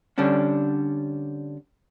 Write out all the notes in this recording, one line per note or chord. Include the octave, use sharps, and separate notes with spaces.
D3 G3 C#4 D4